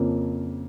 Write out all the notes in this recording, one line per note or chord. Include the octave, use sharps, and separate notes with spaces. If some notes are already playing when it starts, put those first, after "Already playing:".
Already playing: F2 C#3 F3 A#3 C#4